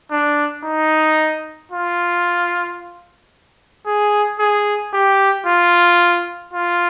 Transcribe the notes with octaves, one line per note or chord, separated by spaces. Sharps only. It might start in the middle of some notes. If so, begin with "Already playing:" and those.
D4
D#4
F4
G#4
G#4
G4
F4
F4